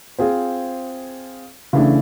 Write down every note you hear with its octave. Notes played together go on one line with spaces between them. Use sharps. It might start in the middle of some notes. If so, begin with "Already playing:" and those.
C4 F4 G#4 C5
C#3 E3 A3 D4